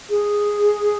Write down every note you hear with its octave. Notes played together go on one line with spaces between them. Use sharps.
G#4